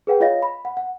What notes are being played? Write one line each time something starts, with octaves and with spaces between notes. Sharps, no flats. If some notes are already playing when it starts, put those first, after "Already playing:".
G#4 B4 F#5 G5
F4 C#5 D#5 F5 A#6
B5
F#5
F#5